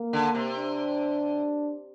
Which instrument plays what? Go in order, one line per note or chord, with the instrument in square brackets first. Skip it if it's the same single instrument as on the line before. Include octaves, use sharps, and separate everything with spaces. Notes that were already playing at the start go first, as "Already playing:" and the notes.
Already playing: [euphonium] A#3
[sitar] D3
C3
[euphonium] D4